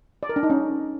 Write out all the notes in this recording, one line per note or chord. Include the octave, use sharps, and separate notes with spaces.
D5
A#4
D4
D#4
C#4